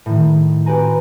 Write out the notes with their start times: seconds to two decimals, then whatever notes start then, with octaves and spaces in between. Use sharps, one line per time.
0.06 A2 D#3
0.66 C4 F#4 G4 B4 G#5 A#5